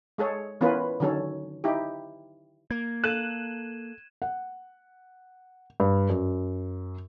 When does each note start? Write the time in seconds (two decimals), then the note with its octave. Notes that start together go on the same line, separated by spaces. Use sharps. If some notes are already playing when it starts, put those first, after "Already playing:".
0.18 G#3 G#4 A4 C#5
0.61 E3 B3 C#4 F4 A#4 B4
1.00 D3 D#3 F#3 C#4 A4
1.64 D#4 E4 G4
2.71 A#3 G#6
3.04 A4 F5 F#6 D#7 E7
4.22 F#5
5.80 G2
6.10 F#2